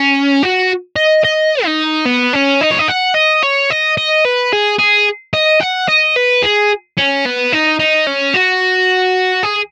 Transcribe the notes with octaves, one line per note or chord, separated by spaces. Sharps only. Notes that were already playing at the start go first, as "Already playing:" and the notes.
Already playing: C#4
F#4
D#5
D#5
D#4
B3
C#4
D#4
C#5
D#5
F#5
D#5
C#5
D#5
D#5
B4
G#4
G#4
D#5
F#5
D#5
B4
G#4
C#4
B3
D#4
D#4
C#4
F#4
G#4